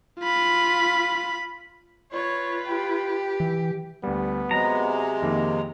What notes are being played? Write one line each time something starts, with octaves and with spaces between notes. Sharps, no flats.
F4 B5
F4 B4 C#5
G4
E3
D2 G3 B3
C3 F#3 G#3 A#5
F2 D#3 A#3